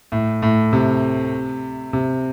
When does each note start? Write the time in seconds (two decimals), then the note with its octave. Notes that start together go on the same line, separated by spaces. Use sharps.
0.12 A2
0.42 A2
0.73 C3
1.93 C3